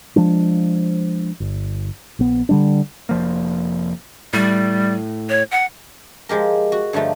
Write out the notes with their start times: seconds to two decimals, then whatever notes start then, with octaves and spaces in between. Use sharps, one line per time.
0.16 F3 G#3 D4
1.40 G1
2.19 A#1 B3
2.49 D3 G3 D4
3.09 F1 F3 A#3
4.33 A2 G3
5.29 C#5
5.51 F#5
6.29 F3 G#3 G4 A#4
6.72 F#4
6.93 G2 D3 F3 A3 D#4